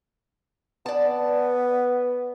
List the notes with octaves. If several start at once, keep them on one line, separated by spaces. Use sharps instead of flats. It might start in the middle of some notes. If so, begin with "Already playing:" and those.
B3 D5 A5